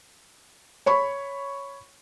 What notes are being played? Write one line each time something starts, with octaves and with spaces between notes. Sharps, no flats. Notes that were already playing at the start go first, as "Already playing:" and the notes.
C#5 B5 C#6